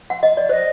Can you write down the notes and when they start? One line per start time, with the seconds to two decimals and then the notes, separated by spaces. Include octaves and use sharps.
0.10 F#5
0.23 D#5
0.37 D5
0.49 C5 D#5